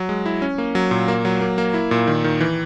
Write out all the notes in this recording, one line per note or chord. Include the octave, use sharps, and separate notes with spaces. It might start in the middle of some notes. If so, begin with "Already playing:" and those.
Already playing: F#3
G#3
E4
C#4
A#3
F#3
A#2
A#3
F#3
A#3
A#3
E4
A#2
D#3
D#3
E3